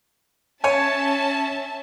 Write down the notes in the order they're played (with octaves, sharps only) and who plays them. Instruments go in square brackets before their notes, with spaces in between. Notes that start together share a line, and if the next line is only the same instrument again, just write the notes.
[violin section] C#4 E5 A5 [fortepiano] C#5 G#5